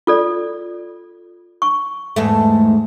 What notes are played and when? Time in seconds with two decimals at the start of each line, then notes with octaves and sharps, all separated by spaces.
0.07 F4 A4 D5
1.62 C#6
2.16 E2 G#2 A3